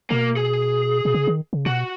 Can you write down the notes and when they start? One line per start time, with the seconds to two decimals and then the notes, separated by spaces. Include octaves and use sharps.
0.10 B2 A#3
0.36 G#4
1.05 B2
1.14 C#3
1.27 D#3
1.53 C#3
1.66 B2 F#4